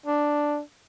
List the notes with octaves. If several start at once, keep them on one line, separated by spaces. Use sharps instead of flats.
D4